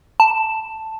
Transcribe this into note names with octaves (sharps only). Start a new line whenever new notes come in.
A5